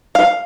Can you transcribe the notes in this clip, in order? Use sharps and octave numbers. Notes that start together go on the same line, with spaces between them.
F5